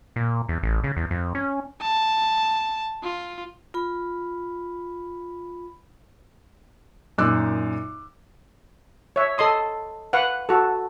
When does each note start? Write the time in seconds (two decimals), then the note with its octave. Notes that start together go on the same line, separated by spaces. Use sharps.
0.16 A#2
0.49 E2
0.63 A1
0.84 C#3
0.97 E2
1.11 F2
1.35 C#4
1.81 A5
3.03 F4
3.74 F4 B5
7.18 F#2 A#2 D#4 D6 E6 F#6
9.16 C#5 E5
9.38 A4 D#5 C6 D#6
10.13 B4 F5 F#5
10.49 F#4 A4